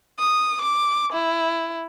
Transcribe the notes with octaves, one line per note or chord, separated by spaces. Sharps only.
D#6
D6
E4